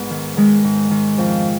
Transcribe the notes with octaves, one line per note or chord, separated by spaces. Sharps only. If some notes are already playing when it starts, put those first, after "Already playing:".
Already playing: G#2 B3
D#3
D#3 G#3
G#2
D#3
F2